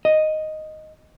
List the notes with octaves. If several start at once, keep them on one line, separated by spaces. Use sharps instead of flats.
D#5